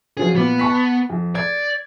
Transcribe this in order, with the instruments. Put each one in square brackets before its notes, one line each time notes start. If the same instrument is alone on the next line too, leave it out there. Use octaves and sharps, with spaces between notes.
[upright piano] F3 F#3 C#4 [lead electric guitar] G#4
[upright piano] A#2 D6 [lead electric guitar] B3
[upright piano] A5 C#6 B6
F2
[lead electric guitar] D5 [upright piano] G#6